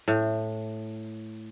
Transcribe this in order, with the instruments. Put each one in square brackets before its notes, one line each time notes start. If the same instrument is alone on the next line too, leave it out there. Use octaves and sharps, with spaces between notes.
[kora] A2